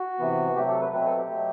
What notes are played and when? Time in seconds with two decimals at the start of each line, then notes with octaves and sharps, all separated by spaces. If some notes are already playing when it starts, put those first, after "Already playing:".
Already playing: F#4
0.19 C3 E3 B3
0.56 C3 F#3 A3 G4
0.68 A4
0.81 B4
0.92 B2 F#3 A3 C4 B4
1.05 A4
1.17 G4
1.29 B2 F#3 A3